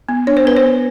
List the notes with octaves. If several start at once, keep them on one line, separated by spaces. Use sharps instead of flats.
B3
D4 C#5
C5
B3 B4
C5
B3